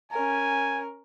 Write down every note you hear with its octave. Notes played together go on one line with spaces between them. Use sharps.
C#4 A#4 G#5